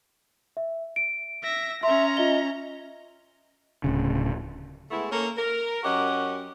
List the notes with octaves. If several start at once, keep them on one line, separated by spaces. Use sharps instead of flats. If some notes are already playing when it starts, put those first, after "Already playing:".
E5
D7
E5 A#6
C#4 E5 A#5 C6
F4 D#5 E5 G7
D1 C#3
G#3 A3 B3 E4
A#3 C#4 A4 A#4
A#4
F#2 C#4 F#4 G4 D#5 F#5